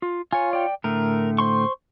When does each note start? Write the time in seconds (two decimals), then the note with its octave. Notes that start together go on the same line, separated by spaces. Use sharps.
0.02 F4
0.33 F4 C#5 G#5
0.53 D5 G5
0.84 A2 D3 A3 A#4
1.38 C5 C6 C#6